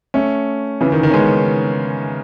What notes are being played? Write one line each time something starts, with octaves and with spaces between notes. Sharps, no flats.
A3 C#4
C#3 E3
D#3
D#3
C#4
G#3 B3